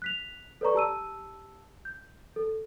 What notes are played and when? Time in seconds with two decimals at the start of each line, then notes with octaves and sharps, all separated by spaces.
0.02 F#6 B6 F7
0.61 A4 B4 C#5 D5 A#5 C#6
0.74 G4 A5 E6 D#7
1.85 G6
2.36 A4